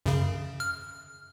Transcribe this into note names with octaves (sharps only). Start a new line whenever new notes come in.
F#2 C#3
F6